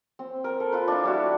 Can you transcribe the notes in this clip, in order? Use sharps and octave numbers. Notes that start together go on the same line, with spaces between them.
C4
A#4
A4
F4 B4
D4 E4
G3 E4 F#4